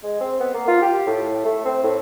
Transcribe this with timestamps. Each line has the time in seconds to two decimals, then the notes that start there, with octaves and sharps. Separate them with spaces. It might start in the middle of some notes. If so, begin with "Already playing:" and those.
0.03 G#3
0.21 C4
0.40 B3
0.54 A#3
0.68 F4
0.82 G4
1.07 A2
1.45 A3
1.65 C4
1.83 A2